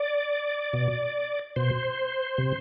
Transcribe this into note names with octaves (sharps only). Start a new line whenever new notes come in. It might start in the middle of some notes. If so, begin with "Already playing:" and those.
Already playing: D5
B2
B2 C5
C3